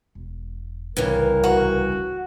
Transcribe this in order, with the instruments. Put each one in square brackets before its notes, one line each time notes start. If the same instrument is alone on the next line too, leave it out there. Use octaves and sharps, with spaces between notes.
[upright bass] E1
[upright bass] D1 C2 [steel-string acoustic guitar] G2 C#3 E3 [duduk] A#4
[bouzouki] F#4